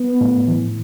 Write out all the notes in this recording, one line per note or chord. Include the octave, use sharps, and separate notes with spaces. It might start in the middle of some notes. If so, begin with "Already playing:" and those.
Already playing: B3
A2
E3